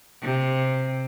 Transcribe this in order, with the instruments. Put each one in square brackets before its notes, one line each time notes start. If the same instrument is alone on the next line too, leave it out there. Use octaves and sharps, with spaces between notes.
[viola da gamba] C3